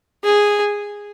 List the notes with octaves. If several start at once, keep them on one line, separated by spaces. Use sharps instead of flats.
G#4